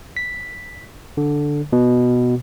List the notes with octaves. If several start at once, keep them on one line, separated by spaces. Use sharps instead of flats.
B6
D3
B2